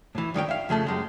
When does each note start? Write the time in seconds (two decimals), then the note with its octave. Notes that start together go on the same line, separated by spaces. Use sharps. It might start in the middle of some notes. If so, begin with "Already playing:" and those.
0.15 A2 E3
0.34 G2 D#3 C#5 G5
0.48 E5 F5
0.69 F2 C#3 A3 A5
0.87 F#2 G#3 G4